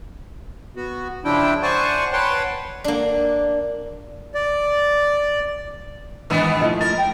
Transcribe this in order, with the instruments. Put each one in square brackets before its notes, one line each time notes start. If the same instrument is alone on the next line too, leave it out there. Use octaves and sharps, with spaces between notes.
[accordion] B3 F#4
C#3 F3 D4 E4 G5
C5 D5 F#5 G#5 A5 C#6
B4 C#5 F#5 G5 A5 C6
[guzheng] A#3 D4
[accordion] D5
[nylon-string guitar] G#2 E3 [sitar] D#3 B3 D4
[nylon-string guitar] F3 A3 E4 [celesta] D#5
[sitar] A#4 [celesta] A6
[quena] G5